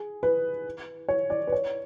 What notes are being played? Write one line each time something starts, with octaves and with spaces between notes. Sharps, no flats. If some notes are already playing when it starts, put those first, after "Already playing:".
Already playing: G#4
B4
C#5
D5
B4
C#5